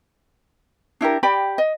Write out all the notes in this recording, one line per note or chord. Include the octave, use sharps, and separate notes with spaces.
D4 E4 G4 A#4
G4 D5 G5 B5
D#5